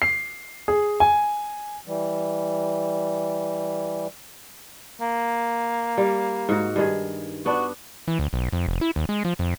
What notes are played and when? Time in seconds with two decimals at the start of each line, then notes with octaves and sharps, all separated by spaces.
0.02 C7
0.68 G#4
1.00 G#5
1.87 E3 G3
5.01 A#3
5.97 G3
6.49 G#2 F#4
6.76 G2 D#3 G#4
7.46 B3 D4 F#4
8.08 E3
8.19 D2
8.33 B1
8.53 F2
8.68 F1
8.81 E4
8.96 D#2
9.09 G#3
9.25 F3
9.39 F2